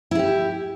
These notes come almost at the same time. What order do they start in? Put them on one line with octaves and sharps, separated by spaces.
E4 G#4 G4